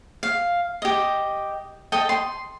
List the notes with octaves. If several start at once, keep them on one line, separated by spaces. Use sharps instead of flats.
F5
G4 D#5
A4 D#5 G5
C6